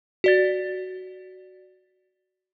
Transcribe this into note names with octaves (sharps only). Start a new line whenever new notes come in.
F#4 D5 A6